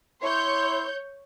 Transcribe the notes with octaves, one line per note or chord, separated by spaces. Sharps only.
E4 C#5 C6 G6